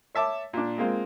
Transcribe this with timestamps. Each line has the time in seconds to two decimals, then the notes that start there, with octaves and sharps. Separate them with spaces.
0.15 C#5 E5 A5 D6
0.53 A#2 D4
0.78 G#3 A#3 C4 F4